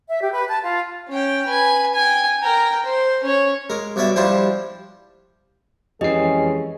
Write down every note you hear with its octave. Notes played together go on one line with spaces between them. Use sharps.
E5
G4
B4
A5
F4
C#4 G5
B4 G#5
G5 G#5
A#4 G5
C5
C#4 C#5
G#3 A#4
G2 B2 C#5 D5 E5 D6
F3 G3 D4 E4 F4 C5
F2 E3 G#3 C#4 G4 G#4 D#5 C7